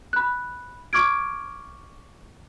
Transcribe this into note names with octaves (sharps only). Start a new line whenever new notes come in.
B5 F#6
C#6 D6 F6 G#6 D7